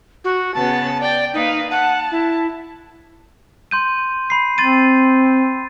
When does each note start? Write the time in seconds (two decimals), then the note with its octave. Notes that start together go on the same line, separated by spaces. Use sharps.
0.24 F#4
0.54 C#3 B3 A5
1.01 D5 G5
1.34 A#3 D#4 B4 F5
1.71 F#5 A5
2.11 E4
3.71 C6 G6 D#7
4.30 B5 C7
4.58 C4 C6 A6 D#7